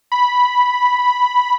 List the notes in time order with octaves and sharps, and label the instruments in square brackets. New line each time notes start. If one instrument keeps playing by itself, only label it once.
[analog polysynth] B5